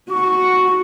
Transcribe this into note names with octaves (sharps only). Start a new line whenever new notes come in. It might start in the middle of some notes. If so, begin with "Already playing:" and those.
F#4 C#6